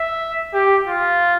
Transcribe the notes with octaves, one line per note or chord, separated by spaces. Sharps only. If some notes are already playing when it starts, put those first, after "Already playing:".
Already playing: E5
G4
F4